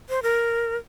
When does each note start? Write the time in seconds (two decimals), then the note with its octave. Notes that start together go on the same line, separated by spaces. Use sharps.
0.09 C5
0.23 A#4